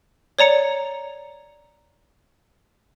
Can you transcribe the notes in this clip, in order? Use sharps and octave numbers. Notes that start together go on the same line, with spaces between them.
C#5 D5 A#5 C#7